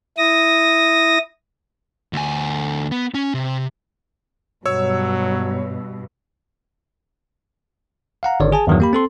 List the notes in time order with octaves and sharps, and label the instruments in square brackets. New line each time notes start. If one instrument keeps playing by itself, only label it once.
[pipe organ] E4 D#6 A#6
[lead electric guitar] D2 G#5
B3
C#4
C3
[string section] G2 B2 [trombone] F#3 [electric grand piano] C#5 E6
[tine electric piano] F5 F#5 A#5
G#1 D3 D#3 C#5 D5
G#4 G#5 A5
E2 G2 D#3 E3 F#3
A#3 G4 B5
C4 A4 C6